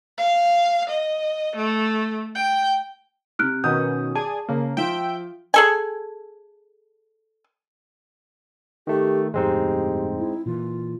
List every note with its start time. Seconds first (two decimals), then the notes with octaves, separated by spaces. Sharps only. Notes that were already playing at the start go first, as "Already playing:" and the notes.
0.18 F5
0.89 D#5
1.56 A3
2.35 G5
3.39 C3 F6 F#6 D7
3.64 B2 D#3 C#4 D#6 G6
4.15 G#4 D5 G#5 A5
4.49 C#3 A#3
4.77 F3 F4 E5 G5
5.54 G#4 A4 G#5
8.87 D#3 A3 G4
9.34 G1 F2 A2 G#3 C4 D#4 G4
10.18 E4
10.46 A#2 E3 F4